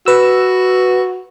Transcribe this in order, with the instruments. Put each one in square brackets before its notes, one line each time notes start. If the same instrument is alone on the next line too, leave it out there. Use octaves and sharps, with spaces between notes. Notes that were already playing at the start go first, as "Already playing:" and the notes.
[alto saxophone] F#4 [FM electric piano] B4 E6